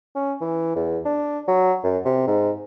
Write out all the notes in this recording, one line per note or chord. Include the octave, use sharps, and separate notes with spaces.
C#4
E3
E2
D4
F#3
F#2
C3
G#2